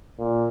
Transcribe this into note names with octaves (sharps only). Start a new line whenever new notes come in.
A#2